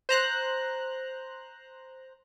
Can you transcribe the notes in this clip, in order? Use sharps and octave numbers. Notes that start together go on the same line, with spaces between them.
C5 A#5 F#6